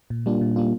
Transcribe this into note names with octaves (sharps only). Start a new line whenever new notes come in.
A#2
G3 A#3 D4 F4
A#2
G3 A#3 D4 F4